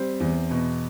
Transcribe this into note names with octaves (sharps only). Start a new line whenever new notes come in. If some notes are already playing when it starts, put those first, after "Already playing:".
Already playing: G3 C4
E2
B2